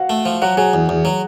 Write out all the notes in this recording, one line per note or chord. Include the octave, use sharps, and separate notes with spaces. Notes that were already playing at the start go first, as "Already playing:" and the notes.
Already playing: F#4 F5 F#5
A3
F3
F#3 F#4 F#5
F#3 G#4 G#5
E2
E2
F#3